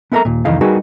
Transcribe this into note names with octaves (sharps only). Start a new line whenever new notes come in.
B3 E4 A4 A#4 E5 A#5
D#2 A#2
C2 F2 D#3 E3 D#4 F5
G3 D#4 F#4 G#4 A#4 B4